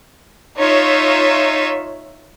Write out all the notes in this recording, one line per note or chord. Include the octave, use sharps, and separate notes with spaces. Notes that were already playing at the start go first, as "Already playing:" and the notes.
D#4 F4 C#5 E5